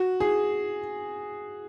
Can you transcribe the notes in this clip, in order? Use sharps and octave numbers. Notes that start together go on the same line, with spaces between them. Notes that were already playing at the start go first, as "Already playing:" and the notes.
Already playing: F#4
G#4